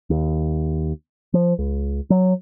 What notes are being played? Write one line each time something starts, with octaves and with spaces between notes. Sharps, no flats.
D#2
F3
C#2
F#3